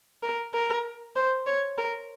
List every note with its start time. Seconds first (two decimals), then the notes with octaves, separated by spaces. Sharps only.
0.23 A#4
0.54 A#4
1.16 C5
1.47 C#5
1.78 A#4